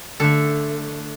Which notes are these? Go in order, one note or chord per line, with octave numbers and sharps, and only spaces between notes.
D3 A3 A4